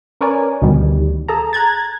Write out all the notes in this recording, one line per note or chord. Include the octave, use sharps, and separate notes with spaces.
C#4 A#4 B4 C#5 D5 G#5
D2 B2 D#3 G3
G#4 A4 A5 A#5
A#5 F#6 G#6 A6